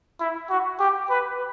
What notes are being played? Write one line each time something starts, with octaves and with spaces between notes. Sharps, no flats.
E4
F#4
G4
B4